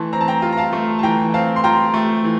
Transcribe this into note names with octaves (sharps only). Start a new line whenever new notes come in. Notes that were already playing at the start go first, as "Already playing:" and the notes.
Already playing: E3 A3 A5 C6
C4 A#5
A5
G5 A#5
F4
A#5
F5 A5
A3
A5
E3 G5 A#5
C4 F5 A5
C6
F4 G5 A#5
A3
E3